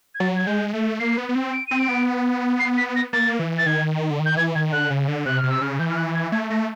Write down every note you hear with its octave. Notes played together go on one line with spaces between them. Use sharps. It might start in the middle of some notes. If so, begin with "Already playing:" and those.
G#6
F#3 A6
G#6
G#3 G6
A3
A#3 C7
B3
B3
C4
D7
C4 D#7
D7
B3
C7
B6
A#6
A#3 A6
E3
A6
D#3 G#6
D3
D#3
G6
E3 G#6
D#3 G#6
D3 F#6
C#3
D3
C3 F#6
C3 F6
E6
C#3 F6
E3 G6
F6
F#6
G#6
A3 G#6
A3 A#6